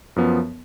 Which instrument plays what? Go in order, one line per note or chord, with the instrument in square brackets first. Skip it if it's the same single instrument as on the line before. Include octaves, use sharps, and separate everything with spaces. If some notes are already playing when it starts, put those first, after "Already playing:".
[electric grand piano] F#2 F3 B3